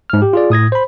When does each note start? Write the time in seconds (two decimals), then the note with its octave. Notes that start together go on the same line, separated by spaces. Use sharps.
0.10 G#2 F6
0.22 G4
0.33 F4 G#4 D5
0.50 A2 D#6 G#6 A#6
0.72 C5 B5